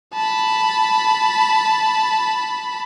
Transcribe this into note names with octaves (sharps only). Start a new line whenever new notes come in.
A5 B5